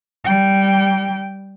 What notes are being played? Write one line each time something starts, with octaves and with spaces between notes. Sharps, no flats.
G3 G5